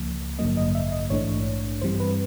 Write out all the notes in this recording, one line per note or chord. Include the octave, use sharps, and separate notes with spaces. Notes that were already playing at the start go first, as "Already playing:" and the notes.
Already playing: C#2 C#3 F3 A#3
A1 G2 D3 F#3 A#3 D#5
D#5
E5
D#5
A#1 G#2 E3 A3 D4 C#5
G2 E3 G3 C4 C5
B4